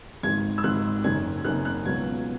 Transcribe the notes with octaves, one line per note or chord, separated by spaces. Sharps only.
G#1 G#2 D#3 G#6
E6
G#1 G#2 D#3 F#6
F#1 F#2 D#3 G#6
F#1 F#2 D#3 F#6
F#6
C#2 B2 F#3 G#6